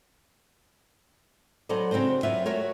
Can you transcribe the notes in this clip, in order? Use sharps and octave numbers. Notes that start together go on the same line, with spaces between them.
F#3 B3 D#4 A4 C5 D5
C#3 C4 D4 F#4 C5
F#3 F4 B4 D5 E5
A3 F#4 A#4 C#5